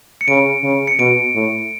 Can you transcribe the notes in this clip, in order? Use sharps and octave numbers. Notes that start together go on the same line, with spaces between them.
C#7
C#3 D7
C#3
C#7
B2 D7
A2